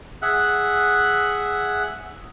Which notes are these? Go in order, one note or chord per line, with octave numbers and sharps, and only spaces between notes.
G#4 E5 F#5 F#6